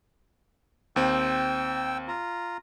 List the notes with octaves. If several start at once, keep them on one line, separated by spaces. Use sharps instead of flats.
D#2 C4 G5 E6
F4 A#5